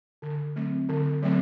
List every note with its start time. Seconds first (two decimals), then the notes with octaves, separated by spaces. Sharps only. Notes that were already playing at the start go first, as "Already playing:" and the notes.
0.22 D3
0.56 F#3 A3 C4
0.89 D3
1.22 F#3 A3 C4